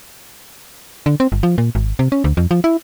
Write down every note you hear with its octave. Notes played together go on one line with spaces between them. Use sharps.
D3
C4
G1
F3
A#2
G#1
C3
C#4
D2
F2
F3
E4